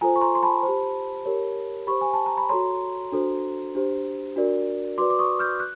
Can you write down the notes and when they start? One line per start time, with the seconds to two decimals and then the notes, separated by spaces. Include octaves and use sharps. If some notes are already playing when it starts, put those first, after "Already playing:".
0.01 F4 A4 C5 G#5 A#5
0.16 C#6
0.21 A#5 C6
0.35 C6
0.43 A5 B5
0.63 C5
0.68 G4
1.25 G4 A#4 C#5
1.87 G4 C5 B5 C#6
2.01 G#5
2.13 A5
2.26 A#5
2.37 B5
2.49 F#4 A4 C#5 A#5 C6
3.12 D4 F#4 A4 C5
3.75 D4 G4 C5
4.36 D4 F#4 A#4 D5
4.98 F#4 B4 D5 C6 D6
5.10 D6
5.19 C#6 D#6
5.39 F6 G6
5.60 F#6